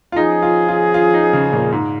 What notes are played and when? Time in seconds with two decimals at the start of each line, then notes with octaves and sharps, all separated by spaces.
0.12 F4
0.16 F3 C#4 D#4 G#4
0.42 F4
0.68 F4
0.94 F4
1.14 D#4
1.33 C#3
1.53 A#2
1.72 G#2